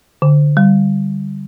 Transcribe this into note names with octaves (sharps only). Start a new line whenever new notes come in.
D3
G3